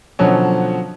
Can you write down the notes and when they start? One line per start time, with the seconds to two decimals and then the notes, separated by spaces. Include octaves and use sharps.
0.19 B2 D3 F3 F#3 C#4